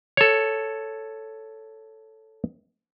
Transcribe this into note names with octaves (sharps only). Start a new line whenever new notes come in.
A4 C#5